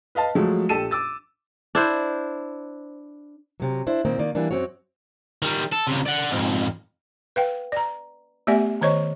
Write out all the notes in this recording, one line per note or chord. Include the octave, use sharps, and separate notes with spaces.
B4 D#5 F5 A5
F3 F#3 G#3 A3
A#1 G4 A4 A5 D#7 E7
D6 E6 A6
D4 E4 C5
C3 F#3
D4 E4 C5
A#2 D#3 A#3 C4
D#3 A#3 D5
E3 G3 A#3 D4
F#2 C4 F#4 C#5
D#3 G3
A4
C#2 C3
D5 F#5
F2 G#2
B4 F5 G5
D5 A#5
A3 B3 G4 D5 E5 G#5
D#3 C5 C#5 D#5 C#6